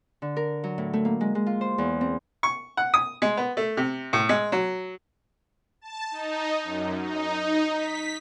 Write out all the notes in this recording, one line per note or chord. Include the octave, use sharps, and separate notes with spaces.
D3
A#4
F#3
A2
A3
A#3
G#3
G#3
F4
C5
E2
C4
C#6
F#5
D#6
G#3
B3
A3
C3
A2
G#3
F#3
A5
D#4
F#2
D#4
D#4
B6